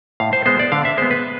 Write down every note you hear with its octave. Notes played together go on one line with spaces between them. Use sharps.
A2 F5
C5
G#3 B3 C5
D5
D3 F5
E5
G#3 B3 C5
B4